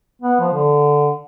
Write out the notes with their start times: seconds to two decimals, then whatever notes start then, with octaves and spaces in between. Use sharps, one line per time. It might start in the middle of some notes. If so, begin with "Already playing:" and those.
0.22 B3
0.39 F3
0.52 D3